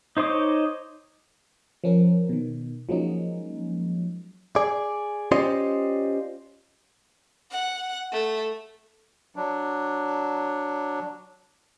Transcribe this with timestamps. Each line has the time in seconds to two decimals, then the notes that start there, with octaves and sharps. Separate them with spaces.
0.17 D#4 C5 C#5 D#5 D6
1.84 F3 C#4 A#4
2.29 B2 D#3
2.89 F3 F#3 G#3 A#3 C#4 D#4
4.56 G#4 D5
5.32 C#4 F4 G4 C5 D5 D#5
7.51 F#5
8.12 A3
9.36 F#3 D4